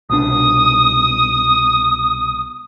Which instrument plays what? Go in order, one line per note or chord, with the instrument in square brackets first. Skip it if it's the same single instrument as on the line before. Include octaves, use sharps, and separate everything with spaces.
[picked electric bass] C2 B2 D4 [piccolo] D#6